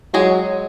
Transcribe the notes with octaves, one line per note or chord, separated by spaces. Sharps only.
F#3 G#3 G#4